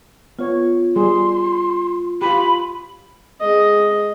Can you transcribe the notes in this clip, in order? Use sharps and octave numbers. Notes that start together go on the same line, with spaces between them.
B3 F4 C#5
G3 G#4 C6
F4 G4 B5
G#3 D#5